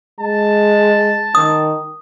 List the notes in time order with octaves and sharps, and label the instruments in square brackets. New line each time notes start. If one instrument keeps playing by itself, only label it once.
[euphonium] G#3 [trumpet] A5
[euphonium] D#3 [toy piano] D#6